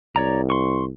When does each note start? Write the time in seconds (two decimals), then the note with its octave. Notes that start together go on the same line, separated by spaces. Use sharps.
0.16 C2 C#5 D5 A#5
0.50 C6 C#6